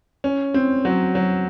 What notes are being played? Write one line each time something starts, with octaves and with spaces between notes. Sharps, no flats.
C#4
C4
F#3
F#3